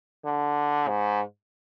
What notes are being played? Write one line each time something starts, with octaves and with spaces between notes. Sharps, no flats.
D3
G#2